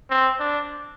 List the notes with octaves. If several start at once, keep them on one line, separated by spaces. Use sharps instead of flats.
C4
D4